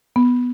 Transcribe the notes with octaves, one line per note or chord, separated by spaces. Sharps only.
B3